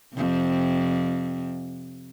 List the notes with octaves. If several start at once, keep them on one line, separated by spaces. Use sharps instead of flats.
F2 C3